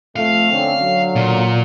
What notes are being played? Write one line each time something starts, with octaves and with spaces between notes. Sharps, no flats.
F2 A3 F5
D3 C4 C#4
D3 F#3
A#2